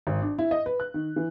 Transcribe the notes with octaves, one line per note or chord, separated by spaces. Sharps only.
G#1
D4
E4
D#5
B4
F#6
D#3
E3